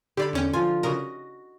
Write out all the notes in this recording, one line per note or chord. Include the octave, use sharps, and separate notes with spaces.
D3 G4 D5 B5
E2 C#4 G5
F3 F4 G#5
C#3 F#4 A#4 D#5